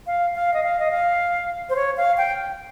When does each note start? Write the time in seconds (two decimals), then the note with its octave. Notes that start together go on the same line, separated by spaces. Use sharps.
0.07 F5
0.35 F5
0.53 D#5
0.63 F5
0.79 D#5
0.91 F5
1.69 C5
1.76 C#5
1.97 F5
2.17 G5